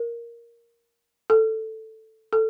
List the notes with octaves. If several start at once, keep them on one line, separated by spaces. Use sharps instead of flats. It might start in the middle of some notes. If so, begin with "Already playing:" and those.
Already playing: A#4
A4
A4